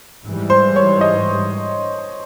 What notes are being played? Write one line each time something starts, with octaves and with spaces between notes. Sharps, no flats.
G#2 E3 G3
C5
C#5
D#5